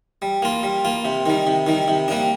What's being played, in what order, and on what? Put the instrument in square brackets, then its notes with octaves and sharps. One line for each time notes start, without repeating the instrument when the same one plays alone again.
[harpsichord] G3
A#3 F4
G3
A#3 F4
C3
D#3 G3
C3
D#3 G3
C3
G3 A#3 D4